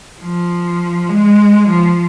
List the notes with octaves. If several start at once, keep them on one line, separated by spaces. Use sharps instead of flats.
F3
G#3
F3